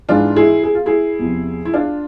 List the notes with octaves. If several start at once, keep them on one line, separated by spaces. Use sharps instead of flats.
G#2 E3 D4 F4
E4 G#4
G#4
F4
E4 G#4
E2 C3 F3
E4
D4 F4